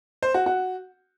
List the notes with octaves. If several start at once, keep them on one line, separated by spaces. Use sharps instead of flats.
C5
F#4
F#4